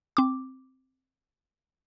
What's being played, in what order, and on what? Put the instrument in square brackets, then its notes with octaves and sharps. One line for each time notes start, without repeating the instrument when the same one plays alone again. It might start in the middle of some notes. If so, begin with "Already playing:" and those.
[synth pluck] C4 D6